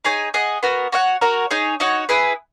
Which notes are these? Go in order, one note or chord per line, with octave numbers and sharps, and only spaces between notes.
D#4 G#4 C#5 G#5
G#4 D#5 F#5
B3 F#4 A#4
F#4 C#5 F#5
F#4 A#4 C#5
D#4 G#4 C#5
D#4 F#4 C#5 F#5
E4 G#4 B4